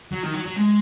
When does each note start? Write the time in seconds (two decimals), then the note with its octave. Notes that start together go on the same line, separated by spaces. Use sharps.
0.12 F#3
0.23 D#3
0.34 F#3
0.46 F#3
0.56 G#3